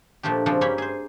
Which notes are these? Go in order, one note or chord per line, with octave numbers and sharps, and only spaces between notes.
A#2 F3 A3 D4 G4
C#3 F3 G3 C4 D4
G2 A#3 C#4 G4 C#5 B5
G#4 C5